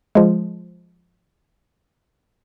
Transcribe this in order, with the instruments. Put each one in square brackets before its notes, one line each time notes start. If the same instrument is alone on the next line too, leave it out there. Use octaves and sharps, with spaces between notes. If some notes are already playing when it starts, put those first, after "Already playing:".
[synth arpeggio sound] F3 G#3